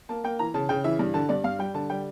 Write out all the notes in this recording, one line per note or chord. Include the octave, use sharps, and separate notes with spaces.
A#3 A5
A#3 G5
E3 A#5
C#3 A5
C#3 G5
E3 E5
G2
D3 A5
G2 D5
G2 F5
G3 G5
D3 A5
G3 G5